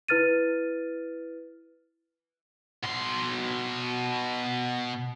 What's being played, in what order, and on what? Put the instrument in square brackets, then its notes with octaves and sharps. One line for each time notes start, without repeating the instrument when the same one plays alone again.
[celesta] E4 B4 F6 A6 D#7
[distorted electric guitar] B2 C6